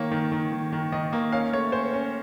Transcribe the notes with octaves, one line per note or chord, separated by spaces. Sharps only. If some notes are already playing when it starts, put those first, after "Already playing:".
Already playing: D#3 A#3 C#5
D#3
D#3
D#3
D#3
D#3 D#5
A#3
C#4 F5
A3 C#5
C#4 C5
C#4